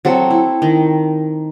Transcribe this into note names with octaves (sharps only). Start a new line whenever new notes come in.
F#3 C4 A4
E4
D#3